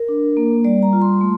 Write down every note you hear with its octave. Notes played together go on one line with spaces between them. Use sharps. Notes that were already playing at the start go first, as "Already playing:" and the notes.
Already playing: A#4
D4
A#3
G3 D5
A#5
F4
C6
A3